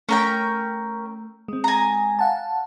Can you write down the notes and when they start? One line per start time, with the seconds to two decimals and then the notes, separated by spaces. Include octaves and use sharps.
0.09 A3 C#4 A#4 G5
1.48 G#3 C4
1.64 G#5 A#5
2.19 F5 F#5 A5